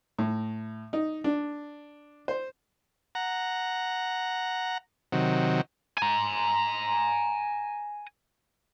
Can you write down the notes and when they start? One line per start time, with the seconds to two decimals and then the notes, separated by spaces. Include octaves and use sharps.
0.19 A2
0.93 D#4
1.24 D4
2.28 C5
3.15 F#5 A#5
5.12 C3 D#3 F#3
5.98 G#5 A#5